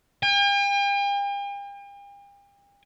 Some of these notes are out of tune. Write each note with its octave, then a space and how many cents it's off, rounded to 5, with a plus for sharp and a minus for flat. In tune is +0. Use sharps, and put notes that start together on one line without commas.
G5 +45